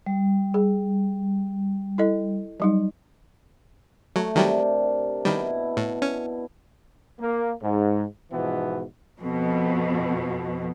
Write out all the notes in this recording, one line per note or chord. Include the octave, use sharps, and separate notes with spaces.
G3
G#4
E4 A4 D#5
F#3 G3 D#4
F#3 A3
C3 D#3 F#3 G3 D4 A#4
B2 D#3 G3 E4
A2
C#4
A#3
G#2
G#2 B2 E3 F3 B3
F2 B2